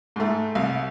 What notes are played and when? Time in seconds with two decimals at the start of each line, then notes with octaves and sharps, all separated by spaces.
0.16 G#2 A3
0.55 C2